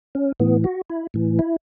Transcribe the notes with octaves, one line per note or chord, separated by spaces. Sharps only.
C#4
A2 E3 B3
F#4
E4
A2 E3
E4